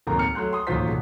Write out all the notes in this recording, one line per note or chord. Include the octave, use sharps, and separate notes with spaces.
D1 D#2 A#3 C4 A#5
F6 C#7
F#3 A3 C6 F#6
C6 D#6
A1 D#2 F#3 F4 C5 B6
E1